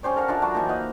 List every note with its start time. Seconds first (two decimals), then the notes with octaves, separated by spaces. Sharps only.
0.03 C#4 G4 C5 D5
0.16 A4 A#4 F5 F#5
0.28 D4 F4 D5 E5
0.42 F#3 F#4 A5 A#5
0.55 E3 A#3 D#4
0.69 D#5 F5 F#5